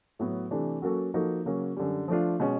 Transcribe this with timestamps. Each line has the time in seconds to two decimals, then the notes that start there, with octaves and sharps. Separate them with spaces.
0.19 A2 F#3 B3
0.51 C3 E3 A3 D4
0.82 F#3 A#3 C#4 F#4 A4
1.14 F3 A#3 D#4 F#4 A4
1.45 C#3 F#3 A#3 C#4
1.77 F#2 D3 G3
2.08 F3 A3 D4 F4
2.40 B2 G#3 C#4